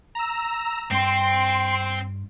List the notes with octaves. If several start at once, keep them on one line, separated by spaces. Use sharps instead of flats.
A#5 E6
G2 C4 G5 C6 D7